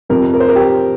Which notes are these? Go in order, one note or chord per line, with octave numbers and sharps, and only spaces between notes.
F2 C3 F3 A#4
A#4
C5
A#4
G4